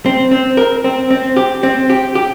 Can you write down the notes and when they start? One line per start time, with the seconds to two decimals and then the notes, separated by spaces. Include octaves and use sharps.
0.06 C4
0.32 C4
0.57 A#4
0.84 C4
1.11 C4
1.37 G4
1.63 C4
1.90 G4
2.15 G4